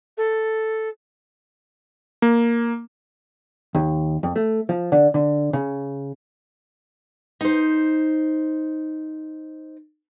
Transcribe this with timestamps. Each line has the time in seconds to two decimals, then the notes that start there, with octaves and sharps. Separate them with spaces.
0.17 A4
2.22 A#3
3.75 D#2
4.23 F2
4.36 A3
4.69 F3
4.92 D3
5.14 D3
5.53 C#3
7.41 D#4 C5